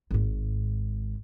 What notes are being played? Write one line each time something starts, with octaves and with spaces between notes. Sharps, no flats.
G#1 G#2